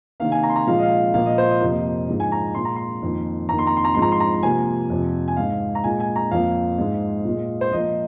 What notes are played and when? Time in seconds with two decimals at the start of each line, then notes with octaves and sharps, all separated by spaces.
0.20 C3 D#3 A#3 F5
0.32 G#5
0.43 A#5
0.49 C6
0.56 A#5
0.67 A#2 F3 G#3 F5
0.78 D#5
0.82 F5
1.14 A#2 F3 A#3 F5
1.26 D#5
1.38 C5
1.50 D#5
1.60 F2 C3 F3 A#3
2.08 G#2 F3 G#3
2.20 G#5
2.32 A#5
2.54 A#2 G#3 C6
2.65 A#5
2.76 C6
3.03 F2 D#3 A#3
3.49 F2 D#3 A#3 A#5
3.58 C6
3.67 A#5
3.76 C6
3.85 A#5
3.94 G#2 F3 G#3 C6
4.02 A#5
4.12 C6
4.20 A#5
4.43 C3 F3 A#3 G#5
4.90 F2 C3 F3
5.28 G#5
5.37 G#2 G#3 F5
5.75 A#5
5.84 A#2 G#3 G#5
6.00 G#5
6.16 A#5
6.31 F2 F3 A#3 F5
6.78 G#2 G#3
7.25 A#2 G#3
7.61 C5
7.72 A#2 F3 A#3 D#5